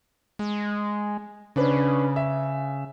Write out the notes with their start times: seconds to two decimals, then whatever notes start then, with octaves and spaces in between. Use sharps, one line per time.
0.39 G#3
1.56 C#3 C#4 D4 B4
2.16 E5